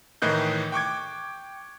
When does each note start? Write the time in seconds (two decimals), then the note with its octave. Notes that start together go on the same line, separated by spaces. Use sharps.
0.22 A2 D#3 E3 D#4 F#6 G6
0.72 G5 C#6 D6 G#6